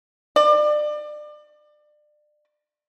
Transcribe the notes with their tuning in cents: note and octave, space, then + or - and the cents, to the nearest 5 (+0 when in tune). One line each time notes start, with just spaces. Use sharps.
D5 +30